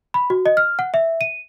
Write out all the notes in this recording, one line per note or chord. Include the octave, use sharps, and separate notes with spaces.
B5
F#4
D#5
F6
F#5
E5
D#7